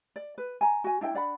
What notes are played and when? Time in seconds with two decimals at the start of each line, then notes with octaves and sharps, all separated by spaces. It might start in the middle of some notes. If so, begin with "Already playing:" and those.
0.16 D5
0.38 B4
0.61 G#5 A#5
0.84 F#4 G#5
1.01 D4 E4 D#5 G5
1.14 D4 D5 F#5 B5